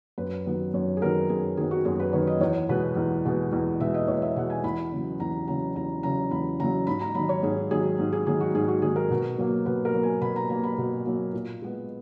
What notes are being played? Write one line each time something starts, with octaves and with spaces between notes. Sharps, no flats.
F#2 B4
D#3 F#3 B3
F#2 C#5
G#4
D#3 F#3 B3 A#4
F#2 G#4
D#3 F#3 B3 G#4
F#4
F#2 G#4
B4
D#3 F#3 B3 C#5
D#5
E2 C#5
B2 G#3 B3 B4
E2
B2 G#3 B3
E2
B2 G#3 B3 E5
D#5
E2 C#5
E5
B2 G#3 B3 F#5
G#5
E2 B5
C#3 F#3
E2 A#5
C#3 F#3 A#5
E2 A#5
C#3 F#3 A#5
E2 B5
C#3 F#3 A#5
G#2 B5
A#5
D#3 F#3 B5
C#5
G#2 G#4
D#3 F#3 G#4
G#2
G#4
D#3 F#3 G#4
F#4
G#2 G#4
F#4
D#3 F#3 G#4
A#4
B2
F#3 A#3
B2 B4
A#4
F#3 A#3
G#5
B2 B5
A#5
F#3 A#3 A#5
B5
B2
F#3 A#3
A#2
G#3 B3